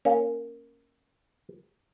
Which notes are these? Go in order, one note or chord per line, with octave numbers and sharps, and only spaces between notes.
A#3 C#4